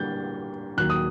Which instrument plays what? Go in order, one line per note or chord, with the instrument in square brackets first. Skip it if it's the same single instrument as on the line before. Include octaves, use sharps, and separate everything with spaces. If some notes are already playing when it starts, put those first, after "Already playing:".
Already playing: [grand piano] D3 G3 A#3 G6 A6
D#2 D#3 F#3 A#3 F#6
D#6